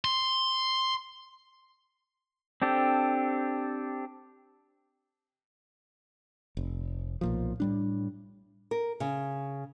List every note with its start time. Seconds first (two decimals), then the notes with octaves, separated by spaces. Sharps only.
0.04 C6
2.62 C4 D4 G4 A4
6.57 F1
7.21 B1 A#2 F3
7.60 A2 G3 D4
8.71 A#4
9.00 C#3